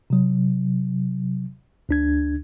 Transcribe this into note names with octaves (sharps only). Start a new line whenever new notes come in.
C3 F#3
D2 D4 G#6